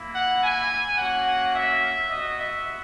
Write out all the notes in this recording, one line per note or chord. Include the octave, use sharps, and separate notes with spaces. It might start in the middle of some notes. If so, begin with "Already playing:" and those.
Already playing: A#3 E4
F#5
G#5
A#3 C#4 F#4 F#5
E5
B3 F#4 D#5
E5